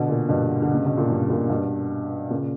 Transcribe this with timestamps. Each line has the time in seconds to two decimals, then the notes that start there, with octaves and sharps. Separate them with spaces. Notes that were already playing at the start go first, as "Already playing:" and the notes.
Already playing: B2 D3
0.08 A#2
0.29 G2 B2
0.62 D3
0.74 C#3
0.86 B2
0.97 A#2
1.10 G2
1.30 A#2
1.49 G2 B2
2.30 A#2 C#3